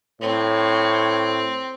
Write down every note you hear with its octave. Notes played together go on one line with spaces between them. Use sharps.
A2 C4 C#5